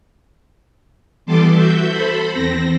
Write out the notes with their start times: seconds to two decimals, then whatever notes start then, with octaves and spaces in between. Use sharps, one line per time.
1.26 E3 G3 B3 A4 C6 D6
1.54 F#4 E5 G6
1.88 A4 C5 B5
2.32 E2 C4 A#6